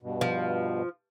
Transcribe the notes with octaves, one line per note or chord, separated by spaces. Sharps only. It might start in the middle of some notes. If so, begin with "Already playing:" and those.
G2 B2
F3